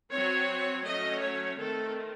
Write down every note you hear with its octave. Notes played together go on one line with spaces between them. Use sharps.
F#3 C4 C#5
F#3 A3 C#4 D#5
C#5
D#3 A3 C4 A4